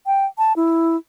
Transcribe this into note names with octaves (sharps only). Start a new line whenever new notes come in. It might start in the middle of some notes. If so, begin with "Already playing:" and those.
G5
A5
E4